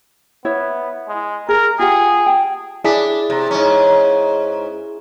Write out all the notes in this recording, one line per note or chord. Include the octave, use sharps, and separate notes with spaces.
B3 E4 C#5 E5
G#3
G#4 A#4
F4 G4 G#4 F#5
G5 A5
D4 E4 G#4 B6
C3
G#2 C#4